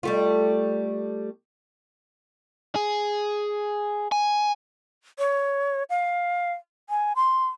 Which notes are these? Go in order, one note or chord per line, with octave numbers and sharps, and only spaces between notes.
G3 A3 F4
G#4
G#5
C#5
F5
G#5
C6